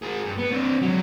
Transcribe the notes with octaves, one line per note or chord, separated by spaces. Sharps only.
G#4 A#4
G2
B3
C4 D4
F#3 G#3